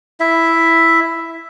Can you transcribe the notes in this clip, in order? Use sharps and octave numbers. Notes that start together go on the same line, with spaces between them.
E4 E5